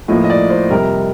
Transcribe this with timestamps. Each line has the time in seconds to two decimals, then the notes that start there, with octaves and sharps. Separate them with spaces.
0.08 A2 F3 A#3 D#5
0.24 D#5
0.30 D5
0.50 C5
0.70 F2 C3 G3 A#4